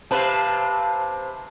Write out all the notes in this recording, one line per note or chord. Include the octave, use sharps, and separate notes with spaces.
C3 B4 F5 A5